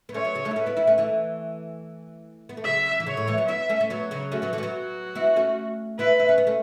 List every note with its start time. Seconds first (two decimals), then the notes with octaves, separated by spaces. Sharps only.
0.09 B3
0.14 A3 C#4 C#5
0.25 F#3 B3
0.35 C#3 F#3
0.45 A3 C#4
0.51 E4
0.56 A3 C#4 B4
0.66 B3 E4
0.77 B3 E4
0.87 A3 C#4
0.98 E3 A3
2.49 B3
2.57 A3
2.64 C#3 F#3 E5
3.00 E3
3.07 C#3 F#3 C#5
3.17 A2
3.27 E3 A3
3.38 F#3 B3
3.48 B3 E4 E5
3.69 A3 C#4
3.81 C#4
3.90 F#3 B3 C#5
4.11 C#3 F#3
4.32 A3 C#4 F#4
4.42 F#3 B3
4.53 E3 A3
4.58 C#4
4.63 F#3 B3
4.74 F#4
5.15 B3 E4
5.36 A3 C#4
5.99 B3 E4 B4
6.20 E4
6.29 C#4
6.38 B3
6.47 A3 C#4